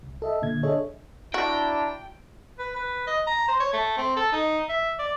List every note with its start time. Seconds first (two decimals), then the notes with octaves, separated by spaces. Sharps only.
0.03 C2
0.22 A4 D#5 E5
0.42 A#2 D3 G#6
0.63 D4 G#4 A4 C#5 D#5 E5
1.34 D4 E4 F#4 G5 A5 A#5
2.59 B4
2.76 B4
3.07 D#5
3.27 A#5
3.48 C5
3.60 C#5
3.73 A3
3.97 C4
4.16 A4
4.32 D#4
4.69 E5
4.99 D5